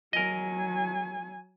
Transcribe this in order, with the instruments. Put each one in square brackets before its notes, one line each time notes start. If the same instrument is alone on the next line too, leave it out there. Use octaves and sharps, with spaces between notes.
[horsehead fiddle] F#3 G#5 [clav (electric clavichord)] A#4 D#5